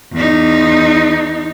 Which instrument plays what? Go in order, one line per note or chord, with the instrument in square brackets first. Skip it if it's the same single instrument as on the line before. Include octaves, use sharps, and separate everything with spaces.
[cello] E2 D#4